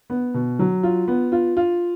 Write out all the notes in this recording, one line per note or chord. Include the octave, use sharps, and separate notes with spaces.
B3
B2
F#3
F4
B3
F4
F4